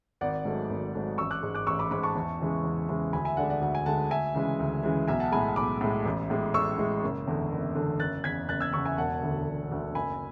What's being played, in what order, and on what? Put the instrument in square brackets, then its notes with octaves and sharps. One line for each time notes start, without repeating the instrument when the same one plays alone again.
[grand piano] G#1 D5 F#5
G#2 F#3 A3
G#1
G#2 F#3 A3
A1 C#6 E6
D6 F#6
G#2 G#3
D6 F#6
A1 C#6 E6
B5 D6
G#2 G#3 B5 D6
A5 C#6
E2
C#3 E3 G#3
E2
C#3 E3 G#3
D2 G#5 B5
E5 G#5
D3 G#3 D5 F#5
D5 F#5
D2 F#5
G#5
D3 G#3 F#5 A5
D2 E5 G#5
C#3 E3 G#3
D2
C#3 E3 G#3
B1 E5 G#5
F#5 A5
A2 G#3 G#5 B5
B1 B5 D6
A2 G#3
A1
A2 G#3
A1 C#6 E6
A2 G#3
F#1
E2 D3
F#1
E2 D3
F#1 F#6 A6
E2 C#3 G#6 B6
F#1 F#6 A6
E6 G#6
E2 C#3 C#6 E6
E5 G#5
E1 F#5 A5
D2 D3
E1
D2 D3
F#1 G#5 B5